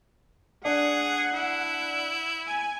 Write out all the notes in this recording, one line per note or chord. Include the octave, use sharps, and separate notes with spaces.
D4 G#4 F#5
E4
G#5